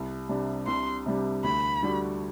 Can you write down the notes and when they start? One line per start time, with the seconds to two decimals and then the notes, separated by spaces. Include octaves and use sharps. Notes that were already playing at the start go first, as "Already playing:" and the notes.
Already playing: C2
0.29 C3 G3 D4
0.67 C2 C6
1.06 C3 G3 D4
1.44 D2 B5
1.83 D3 G3 D4 F#4